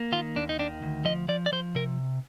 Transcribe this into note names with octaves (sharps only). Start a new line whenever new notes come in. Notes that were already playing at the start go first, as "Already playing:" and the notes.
Already playing: A#3
D#3 F4
D#2 D4
D#4
D#3 D4
D2
F3 D#5
F3 D5
D5
F3 C5
C3 A#4